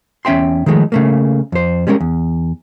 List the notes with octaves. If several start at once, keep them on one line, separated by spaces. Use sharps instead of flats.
E2 C#4 E5 G5 C6
D#3 F3 G#3 A3
C#3 A3 A#3
F2 C5
G3 G#3 B3 C#4 A#4
E2